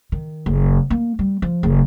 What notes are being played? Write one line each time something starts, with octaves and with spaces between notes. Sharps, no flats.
D#3
F#1
A#3
G3
F3
F#1